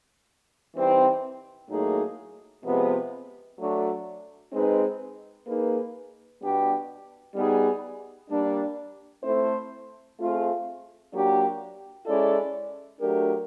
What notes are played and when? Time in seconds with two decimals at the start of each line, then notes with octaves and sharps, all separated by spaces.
0.74 E3 G3 C4 D#4
1.69 A2 F#3 A#3 D#4 G#4
2.64 C3 F3 G#3 B3
3.58 F#3 A3 D4
4.52 G#3 C4 D#4 G#4 B4
5.46 A#3 D#4 G#4 B4
6.41 B2 G3 B3 D4 G4
7.35 G3 B3 D#4 G#4
8.30 G3 A#3 D4
9.23 A3 C4 E4 A4 C5
10.18 A3 C4 F4 G#4
11.12 F#3 A#3 D4 G4
12.06 G#3 C#4 E4 A4 D5
13.00 F#3 A3 D4 G4 A#4